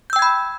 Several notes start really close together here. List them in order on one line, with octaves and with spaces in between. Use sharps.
G6 E6 G5 G#6 B5